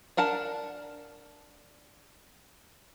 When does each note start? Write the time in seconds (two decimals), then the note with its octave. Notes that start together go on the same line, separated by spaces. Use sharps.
0.17 D4 A#4 F#5 A5